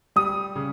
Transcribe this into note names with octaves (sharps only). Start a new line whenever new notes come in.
G3 D#6
C#3